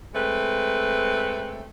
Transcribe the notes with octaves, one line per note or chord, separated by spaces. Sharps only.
G#3 A3 C4 B4